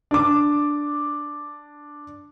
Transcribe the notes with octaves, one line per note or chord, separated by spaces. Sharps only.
D4 D6